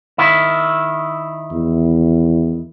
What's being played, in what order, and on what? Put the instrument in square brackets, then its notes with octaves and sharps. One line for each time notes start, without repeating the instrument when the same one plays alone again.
[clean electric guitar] D#3 E4
[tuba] E2